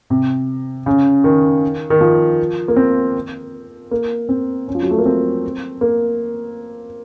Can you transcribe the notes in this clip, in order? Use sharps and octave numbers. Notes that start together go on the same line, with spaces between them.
C3
C#3
D#3
D#3
F3
A#3
C4
A#3
C4
C#4
F3
F#3
A3
A#3
C4
A#3